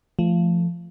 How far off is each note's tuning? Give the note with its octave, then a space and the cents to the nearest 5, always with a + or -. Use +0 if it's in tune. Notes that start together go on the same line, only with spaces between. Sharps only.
F3 -20 A3 +0